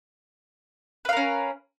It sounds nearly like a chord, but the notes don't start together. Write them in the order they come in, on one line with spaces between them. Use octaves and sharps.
B4 F5 A#4 C#4